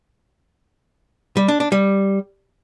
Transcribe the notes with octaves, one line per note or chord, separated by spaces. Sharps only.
G3
D4
D4
G3